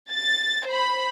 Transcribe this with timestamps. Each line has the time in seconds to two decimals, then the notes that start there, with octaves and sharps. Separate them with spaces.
0.12 A6
0.67 C5 B5